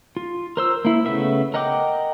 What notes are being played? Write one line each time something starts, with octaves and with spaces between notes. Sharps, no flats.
F4
A#4 C5 E6
A#3 E4
C#3 A3 B3 E5
A#4 D#5 F#5 G5 D6